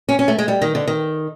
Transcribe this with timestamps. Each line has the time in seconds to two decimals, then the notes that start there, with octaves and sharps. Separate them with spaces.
0.09 C#4
0.19 C#4
0.28 A3
0.38 G#3
0.48 G3
0.62 D#3
0.75 D3
0.87 D#3